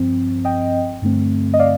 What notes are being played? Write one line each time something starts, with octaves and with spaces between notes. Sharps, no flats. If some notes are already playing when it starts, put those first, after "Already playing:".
Already playing: G2 F3 C4
D#5 G5
G2 D3 A3 C4
D#5
D5 F5